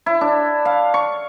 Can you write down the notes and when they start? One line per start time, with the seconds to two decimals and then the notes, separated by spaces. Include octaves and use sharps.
0.06 E4
0.21 D4
0.65 F5
0.94 C#6